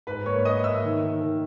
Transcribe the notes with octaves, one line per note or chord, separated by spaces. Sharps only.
G#2 B4 B5
A#3 C#5 C#6
A#3 D#5 D#6
A#3 E5 E6
D#3
D#3
D#3